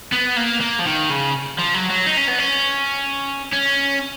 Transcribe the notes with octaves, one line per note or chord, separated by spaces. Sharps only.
B3
A#3
A#3
F3
D#3
C#3
F3
F#3
F#3
D#4
C#4
B3
C#4
C#4